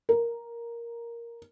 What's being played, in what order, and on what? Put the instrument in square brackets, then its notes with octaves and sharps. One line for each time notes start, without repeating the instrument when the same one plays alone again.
[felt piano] A#4